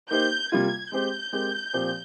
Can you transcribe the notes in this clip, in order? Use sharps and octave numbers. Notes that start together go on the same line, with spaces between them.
A#3 D#4 G4 C5 G6
C3 G3 A#3 F4 G#6
G#3 C4 G4 C5 G6
G#3 C4 G4 A#4
A#2 F3 C4 G4 C5